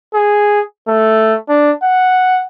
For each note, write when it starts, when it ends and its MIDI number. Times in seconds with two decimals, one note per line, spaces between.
0.14 0.61 68
0.88 1.36 57
1.49 1.72 62
1.83 2.44 78